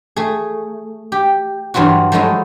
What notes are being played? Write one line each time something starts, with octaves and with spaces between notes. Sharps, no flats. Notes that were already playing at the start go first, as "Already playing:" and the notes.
A3 G#4
G4
G2 E3 F#3 F4 F#4
F3 F#3 G#3 A3 D#4 E4